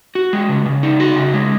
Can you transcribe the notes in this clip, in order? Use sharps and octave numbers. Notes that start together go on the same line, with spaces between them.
F#4
G#3
C#3
C#3
D#4
F#4
C#3
G#3